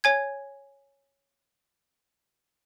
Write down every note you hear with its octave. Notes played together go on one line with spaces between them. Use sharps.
C#5 G#5 G#6